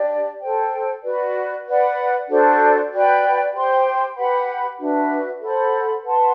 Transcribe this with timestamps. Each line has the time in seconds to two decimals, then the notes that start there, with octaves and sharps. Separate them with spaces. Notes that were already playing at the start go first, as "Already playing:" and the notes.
Already playing: D4 G4 D5
0.41 A4 C5 G5
1.04 F#4 B4 D5
1.66 B4 D5 F#5
2.29 D4 F#4 A4 C5
2.91 F#4 B4 D5 G5
3.53 G4 C5 G5 C6
4.16 G4 B4 F#5 B5
4.79 D4 F#4 B4 E5
5.41 A4 C5 F#5 B5
6.04 B4 F#5 A5 C6